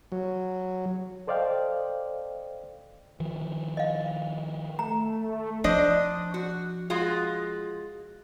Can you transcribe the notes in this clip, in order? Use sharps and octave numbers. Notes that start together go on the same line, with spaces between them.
F#3
A4 C5 D5 D#5 F5 G5
D#3 F3
D#5 F5
A3 A#5
F3 D4 C5 D#5
F#4
G#3 F4 F#4